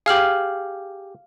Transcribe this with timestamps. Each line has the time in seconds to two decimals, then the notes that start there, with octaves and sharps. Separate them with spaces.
0.06 G4 G#4 F5 F6 F#7